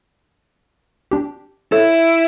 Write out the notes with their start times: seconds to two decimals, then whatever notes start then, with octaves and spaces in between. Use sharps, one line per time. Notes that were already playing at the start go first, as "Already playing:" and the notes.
1.11 D4 G4
1.72 E4 A4 C#5